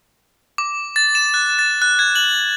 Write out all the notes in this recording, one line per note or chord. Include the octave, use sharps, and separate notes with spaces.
D6
A6
E7
F#6
A6
F#6
G#6
F#7